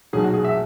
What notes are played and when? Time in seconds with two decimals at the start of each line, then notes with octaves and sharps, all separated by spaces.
0.13 B1 A#2 F#3 G#4
0.24 F#4
0.34 G#4
0.44 E5